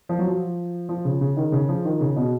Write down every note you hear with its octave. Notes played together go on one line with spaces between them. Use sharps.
F3
F#3
F3
F3
C#3
C#3
D#3
C#3
F3
D#3
C#3
B2